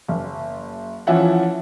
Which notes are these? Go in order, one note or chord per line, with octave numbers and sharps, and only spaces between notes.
F#1
E3 F3 C#4 E5 F#5